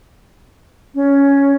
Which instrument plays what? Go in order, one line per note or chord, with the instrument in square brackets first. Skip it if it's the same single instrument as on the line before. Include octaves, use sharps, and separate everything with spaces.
[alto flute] C#4